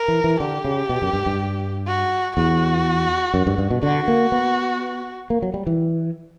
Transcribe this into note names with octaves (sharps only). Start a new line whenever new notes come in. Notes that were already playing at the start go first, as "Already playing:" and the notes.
Already playing: A#4
E3
E3
D3 G4
C#3
B2
F#2
G2
G2
F#4
E2 F#4
F#2
G2
G2
B2
D3 F#4
A#3
B3
A#3
F#3
G3
E3